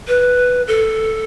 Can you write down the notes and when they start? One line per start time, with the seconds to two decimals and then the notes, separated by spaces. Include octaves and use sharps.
0.08 B4
0.68 A4